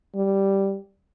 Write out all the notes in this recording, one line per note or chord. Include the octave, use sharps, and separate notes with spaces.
G3